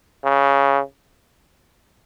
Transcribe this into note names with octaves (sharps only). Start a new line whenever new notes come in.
C#3